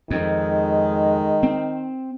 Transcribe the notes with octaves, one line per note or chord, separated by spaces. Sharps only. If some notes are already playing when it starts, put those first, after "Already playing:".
F2 D#3 G#3
C4